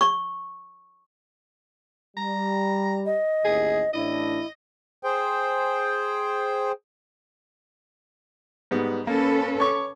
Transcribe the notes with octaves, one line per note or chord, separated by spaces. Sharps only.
C#6
G3 A#5
D#5
A1 D#2 G#4
A1 A2 D4 E4 D#5
G#4 C5 G5
G#2 G3 B3
A#3 C#4 A4 B4
C#5 C#6 D6